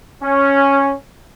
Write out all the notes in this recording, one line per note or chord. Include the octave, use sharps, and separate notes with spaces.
C#4